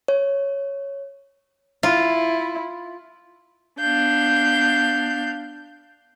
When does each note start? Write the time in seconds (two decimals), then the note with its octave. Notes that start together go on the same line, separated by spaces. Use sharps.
0.08 C#5
1.83 E4 F4
3.78 B3 D4 F5 G6